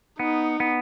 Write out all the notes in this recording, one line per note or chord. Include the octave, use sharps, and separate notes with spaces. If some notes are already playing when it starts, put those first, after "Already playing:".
B3 D#4
B3